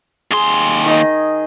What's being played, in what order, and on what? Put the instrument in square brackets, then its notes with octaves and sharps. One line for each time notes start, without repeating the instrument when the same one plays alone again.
[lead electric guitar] D#2 C6 [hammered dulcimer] G#4
[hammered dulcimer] D#3 D#5